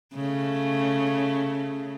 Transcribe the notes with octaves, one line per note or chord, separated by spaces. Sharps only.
C#3 A3